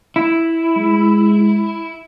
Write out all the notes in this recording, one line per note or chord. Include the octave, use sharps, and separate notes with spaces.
E4
G#3